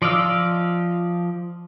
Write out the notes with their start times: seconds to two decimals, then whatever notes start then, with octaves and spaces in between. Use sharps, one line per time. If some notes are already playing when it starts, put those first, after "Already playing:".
0.02 F3 D5 D#5 F5 E6